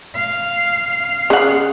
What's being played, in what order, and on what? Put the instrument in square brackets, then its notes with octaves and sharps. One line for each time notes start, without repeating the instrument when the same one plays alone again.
[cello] F5
[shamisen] C#3 F#5